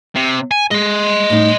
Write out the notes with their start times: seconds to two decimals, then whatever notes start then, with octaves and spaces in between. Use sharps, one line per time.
0.15 C3
0.51 G#5
0.71 G#3 D#5 C6
1.30 A2 D#4